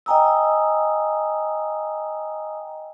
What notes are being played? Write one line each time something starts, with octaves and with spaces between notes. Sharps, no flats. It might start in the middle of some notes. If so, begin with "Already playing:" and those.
D#5 G5 G#5 A#5 D#6 E6